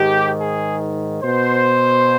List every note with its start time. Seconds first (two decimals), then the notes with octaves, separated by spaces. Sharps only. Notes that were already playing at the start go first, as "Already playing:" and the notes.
Already playing: G#2 D#3 G4
0.40 G#4
1.23 B2 C5